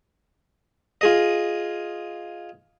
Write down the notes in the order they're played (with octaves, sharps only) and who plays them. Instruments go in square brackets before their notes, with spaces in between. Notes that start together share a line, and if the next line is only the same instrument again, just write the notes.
[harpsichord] F4 G#4 D#5